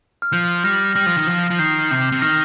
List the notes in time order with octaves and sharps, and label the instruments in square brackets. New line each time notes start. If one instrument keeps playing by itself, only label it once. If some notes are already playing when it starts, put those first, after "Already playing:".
[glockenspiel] F6
[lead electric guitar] F3 [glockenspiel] G6
[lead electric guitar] G3 [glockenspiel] F6 A#6
[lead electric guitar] G3 [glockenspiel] F6 A#6
[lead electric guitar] F3
D#3
F3
F3
[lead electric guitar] D#3 [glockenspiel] G6 C7
[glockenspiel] F6
[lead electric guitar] C3 [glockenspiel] G6
[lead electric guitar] C3
[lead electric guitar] D#3 [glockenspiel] F6 A#6